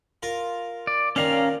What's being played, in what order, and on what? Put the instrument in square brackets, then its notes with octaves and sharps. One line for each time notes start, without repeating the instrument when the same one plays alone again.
[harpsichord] F4 A#4
[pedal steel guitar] D5
[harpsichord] A#2 D#3 D4 [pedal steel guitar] C#4 F5 A#5